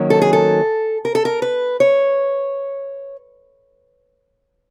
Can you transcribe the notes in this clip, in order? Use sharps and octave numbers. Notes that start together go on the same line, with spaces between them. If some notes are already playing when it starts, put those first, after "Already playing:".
Already playing: D#3 F#3 A#3 C#4
A4
G#4
A4
A#4
A4
A#4
B4
C#5